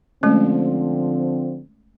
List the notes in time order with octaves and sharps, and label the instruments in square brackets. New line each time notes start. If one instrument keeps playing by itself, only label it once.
[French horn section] D3 F3 C4 [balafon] G#3 A3 C#4